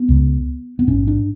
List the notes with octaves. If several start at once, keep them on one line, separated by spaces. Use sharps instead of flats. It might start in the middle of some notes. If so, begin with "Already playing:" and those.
Already playing: B3
C#2 C#3
B3
A1 G#2 C#4
D4